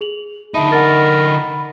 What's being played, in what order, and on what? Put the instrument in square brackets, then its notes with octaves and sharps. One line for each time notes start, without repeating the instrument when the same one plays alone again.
[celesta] G#4 F7 F#7
[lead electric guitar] D3 D#4 [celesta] E5 A5 D#6 [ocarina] B5
[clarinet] A#4 [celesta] F#5 A6